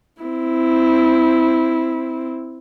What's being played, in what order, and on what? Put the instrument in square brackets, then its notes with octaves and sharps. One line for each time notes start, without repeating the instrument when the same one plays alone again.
[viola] C4 E4